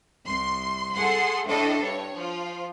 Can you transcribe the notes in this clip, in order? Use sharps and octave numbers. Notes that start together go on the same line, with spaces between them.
C2 C6
G#4 A4 F#5 C6
A2 D4 A4 D#5
G2 C#5
F3 F4